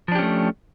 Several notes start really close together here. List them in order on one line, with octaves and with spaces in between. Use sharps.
F3 D4 G4 C#4 A3